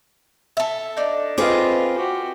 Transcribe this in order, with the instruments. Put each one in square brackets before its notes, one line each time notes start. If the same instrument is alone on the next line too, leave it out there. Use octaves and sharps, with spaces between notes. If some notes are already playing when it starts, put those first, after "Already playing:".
[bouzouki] A4 E5
[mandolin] D4 D#4
[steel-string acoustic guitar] C4 G#4 B4 [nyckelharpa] F4 [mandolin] D#5 F5 D6
[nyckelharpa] F#4 G4